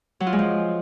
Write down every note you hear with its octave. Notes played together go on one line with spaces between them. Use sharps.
F#3
F4
G#3
F3